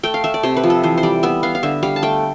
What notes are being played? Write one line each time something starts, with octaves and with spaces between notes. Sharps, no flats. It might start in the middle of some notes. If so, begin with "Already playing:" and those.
A3 G5
F5
A3 E5
D5
C3 C5
B4
F3
A4
E3 C5
C5
G3 D5
B3 E5
B3 F5
F5
D3 E5
G3 F5
A5
A3 G5